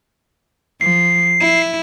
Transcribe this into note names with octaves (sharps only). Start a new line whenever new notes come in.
F3 C7
E4